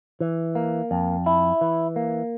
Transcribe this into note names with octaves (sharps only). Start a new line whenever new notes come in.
E3
A#3
F2
E4
E3
A#3